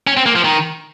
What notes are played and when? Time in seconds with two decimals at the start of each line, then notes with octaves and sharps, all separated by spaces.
0.07 C#4
0.17 C4
0.26 A#3
0.36 F3
0.44 D#3